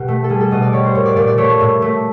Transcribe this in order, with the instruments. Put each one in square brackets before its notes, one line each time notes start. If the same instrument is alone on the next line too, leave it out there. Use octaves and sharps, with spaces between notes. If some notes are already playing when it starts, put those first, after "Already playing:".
Already playing: [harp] B2 G4
A3
A4
G3 G#4
A4
B2 D#5
D5
G3 C#5
C5
A#2 C#5
D5
A#2 D5
D5
A3 C#5
A2
A3